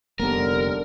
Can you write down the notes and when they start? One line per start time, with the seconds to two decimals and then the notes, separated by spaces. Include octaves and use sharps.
0.19 F1 D#2 D3 G3 A#3 B3 A#4